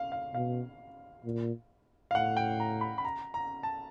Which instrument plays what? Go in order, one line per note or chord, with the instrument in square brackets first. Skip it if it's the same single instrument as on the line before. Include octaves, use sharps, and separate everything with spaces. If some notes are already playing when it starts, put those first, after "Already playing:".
Already playing: [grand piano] F5
F5
[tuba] B2 [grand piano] F5
[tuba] A#2
[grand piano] F5
[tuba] A2 [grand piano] F#5
[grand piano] G5
A#5
B5
B5
A#5
A#5
A5